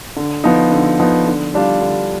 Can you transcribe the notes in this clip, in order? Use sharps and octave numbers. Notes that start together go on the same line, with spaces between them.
D3
F3 B3 D#4
D3
F3 B3 D#4
D3
G3 D4 F4
D3